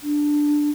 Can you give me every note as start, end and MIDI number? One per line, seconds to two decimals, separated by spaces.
0.03 0.70 62